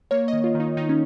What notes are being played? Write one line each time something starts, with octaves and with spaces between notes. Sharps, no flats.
A#3 C#5
D#5
D#3
F4
D#3
D#4
D#3 D#4
C#4